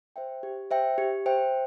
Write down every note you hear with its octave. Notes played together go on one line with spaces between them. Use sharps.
C5 E5 G5
G4
C5 E5 G5
G4
C5 E5 G5